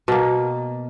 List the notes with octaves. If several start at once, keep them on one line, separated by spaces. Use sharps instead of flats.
B2 A#3